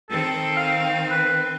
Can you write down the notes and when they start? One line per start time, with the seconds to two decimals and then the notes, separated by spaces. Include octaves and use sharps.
0.10 D#3 C4 A4
0.57 F5
1.10 B4